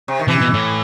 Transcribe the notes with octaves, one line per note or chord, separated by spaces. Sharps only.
C3
D#3
C3 E3
B2
A2